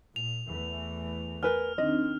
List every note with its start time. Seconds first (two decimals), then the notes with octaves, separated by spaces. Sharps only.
0.16 A#2 F7
0.48 E2 E3 A3
1.43 A#4 B4 G#5 F6
1.78 D#3 C4 D4 D#4 D#5